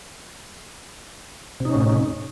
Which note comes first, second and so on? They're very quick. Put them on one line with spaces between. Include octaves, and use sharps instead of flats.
C3 D#4 C#4 A2